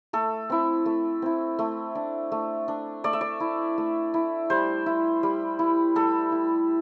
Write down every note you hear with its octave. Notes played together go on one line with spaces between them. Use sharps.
A3 A4
C4 E4
A3
C4 E4
A3
D4
A3
D4
A3 D5
E5
D5
E4
A3
E4
G3 C5
E4
G3
E4
G3 A4
E4